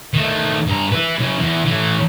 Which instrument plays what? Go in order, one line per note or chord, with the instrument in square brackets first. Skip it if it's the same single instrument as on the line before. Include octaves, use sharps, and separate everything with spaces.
[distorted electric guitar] D#3 A3
G2 A#5
E4 B4
F#2 C#3
E2
A2 E3